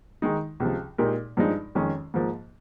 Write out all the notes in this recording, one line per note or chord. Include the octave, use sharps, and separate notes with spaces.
D#3 G#3 D#4
C#2 C3 F3
A#2 G#3 D#4 G4 A#4
G2 F3 G#3 D#4
F2 D#3 G#3 C#4
G#2 F3 A#3